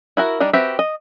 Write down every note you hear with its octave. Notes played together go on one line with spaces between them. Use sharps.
E4 F#4 A#4
G3 D4 D#4
C4 F#4 G4 B4 E5
D#5